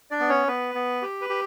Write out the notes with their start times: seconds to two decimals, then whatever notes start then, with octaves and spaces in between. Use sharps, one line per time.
0.11 D4 D5
0.20 B3
0.29 C#4 C#5
0.47 B3 B4
0.75 B3
1.02 G4
1.21 B4
1.30 G4